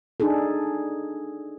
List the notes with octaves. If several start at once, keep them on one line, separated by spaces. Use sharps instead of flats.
D4 D#4 G#4 A4